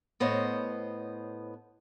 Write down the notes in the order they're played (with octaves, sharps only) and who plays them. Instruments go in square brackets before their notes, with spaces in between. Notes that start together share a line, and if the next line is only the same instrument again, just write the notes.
[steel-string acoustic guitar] A2 B3 C5 C#5 D#5